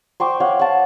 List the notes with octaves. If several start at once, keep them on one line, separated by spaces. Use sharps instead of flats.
C5 G5 C#6 D6
C#5 F5 F#5
F#5 A5